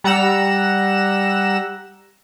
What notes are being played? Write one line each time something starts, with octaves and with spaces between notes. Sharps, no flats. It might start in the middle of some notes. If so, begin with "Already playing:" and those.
G3 F#5 A#5 E6 E7